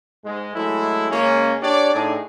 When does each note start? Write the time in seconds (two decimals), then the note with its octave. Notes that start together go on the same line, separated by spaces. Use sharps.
0.23 G#2 G#3
0.54 F#3 G#3 A3 E4
1.10 C#3 G#3 A#3 C#4
1.62 D4 G4 C#5 D5
1.94 A2 D4 D#4 G#4